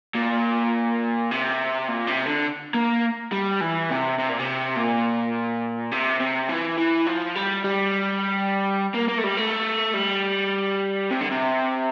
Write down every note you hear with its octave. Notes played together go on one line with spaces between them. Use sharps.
A#2
C3
A#2
C3
D3
A#3
G3
E3
C3
C3
A#2
C3
A#2
C3
C3
E3
E3
F3
G3
G3
A#3
A#3
A3
G3
A3
G3
C3
D3
C3